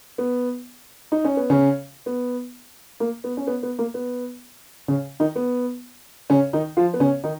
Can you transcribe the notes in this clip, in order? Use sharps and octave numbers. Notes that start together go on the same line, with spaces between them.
B3
D#4
C#4
B3
C#3 C#4
B3
A#3
B3
C#4
B3
B3
A#3
B3
C#3 C#4
D#3 D#4
B3
C#3 C#4
D#3 D#4
F3 F4
B3
C#3 C#4
D#3 D#4